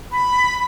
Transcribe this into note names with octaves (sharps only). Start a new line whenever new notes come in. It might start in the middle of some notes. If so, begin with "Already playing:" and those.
B5